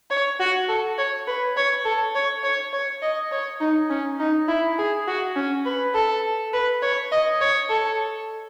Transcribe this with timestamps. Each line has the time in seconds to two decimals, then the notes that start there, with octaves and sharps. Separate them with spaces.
0.10 C#5
0.40 F#4
0.68 A4
0.98 C#5
1.27 B4
1.57 C#5
1.85 A4
2.15 C#5
2.43 C#5
2.73 C#5
3.02 D#5
3.31 C#5
3.61 D#4
3.90 C#4
4.19 D#4
4.48 E4
4.78 G#4
5.07 F#4
5.36 C#4
5.65 B4
5.95 A4
6.53 B4
6.82 C#5
7.12 D#5
7.41 C#5
7.70 A4